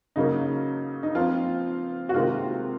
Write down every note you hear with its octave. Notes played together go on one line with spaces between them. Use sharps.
C#3 F#3 A#3 C#4 D#4
D#4
F3 C4 F4
F#4
C3 D#3 G#3 C4 F4